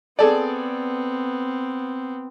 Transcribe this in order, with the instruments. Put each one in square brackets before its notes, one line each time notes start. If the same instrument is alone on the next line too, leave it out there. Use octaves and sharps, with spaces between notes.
[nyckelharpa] B3 C4 [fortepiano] G#4 A4 D5